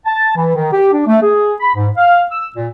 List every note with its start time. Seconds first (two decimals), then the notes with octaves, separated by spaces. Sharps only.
0.05 A5
0.36 E3
0.55 D#3
0.72 G4
0.92 D4
1.07 A3
1.21 G#4
1.60 B5
1.76 G#2
1.96 F5
2.30 E6
2.56 A#2